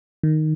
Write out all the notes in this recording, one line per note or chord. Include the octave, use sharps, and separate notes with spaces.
D#3